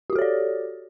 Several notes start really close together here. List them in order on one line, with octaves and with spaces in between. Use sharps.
G4 F#4 A4 C#5 D5